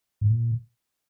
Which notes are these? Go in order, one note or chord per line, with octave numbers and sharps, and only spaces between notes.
G#2
A#2